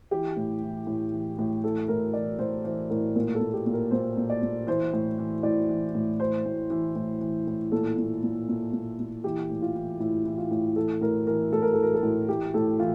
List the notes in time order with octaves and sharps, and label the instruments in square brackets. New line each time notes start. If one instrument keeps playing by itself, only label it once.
[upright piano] E3 G4
A2
E3
A2
E3
A2
E3 A4
A2 A#4
E3 D5
A2 C5
E3 C5
A2 A#4
A#2 A#4
A4
A#2
G4
A#2
A#4
A#2 C5
A#2
D5
A#2
E3 C5
A2
E3
A2 D5
E3
A2
E3 C5
A2
E3
A2
E3
A2
A#2 A4
A#2
A#2
A#2
A#2
A#2
E3 G4
A2
F4
E3
A2 E4
E3
F4
A2
E3 A4
A2 A#4
E3 A#4
A2 A4
A#4
E3 A4
A#4
A4
A2
E3 G4
A2 A4
E3 F4